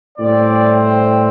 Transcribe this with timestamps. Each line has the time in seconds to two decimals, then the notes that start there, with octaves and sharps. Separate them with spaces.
0.18 A2 G3 C4 D5
0.80 C5